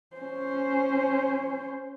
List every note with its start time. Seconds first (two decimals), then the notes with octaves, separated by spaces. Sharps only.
0.17 C#4 C5